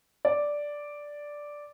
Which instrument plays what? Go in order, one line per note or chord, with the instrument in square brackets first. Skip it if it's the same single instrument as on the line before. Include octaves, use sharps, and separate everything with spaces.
[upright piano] D5